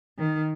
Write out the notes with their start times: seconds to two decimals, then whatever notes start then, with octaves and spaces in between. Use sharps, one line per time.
0.18 D#3